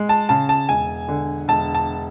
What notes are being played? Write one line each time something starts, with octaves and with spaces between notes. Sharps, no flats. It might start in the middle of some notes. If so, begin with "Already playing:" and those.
Already playing: G#3
A5
C#3 A5
A5
E1 G#5
D3
E1 A5
A5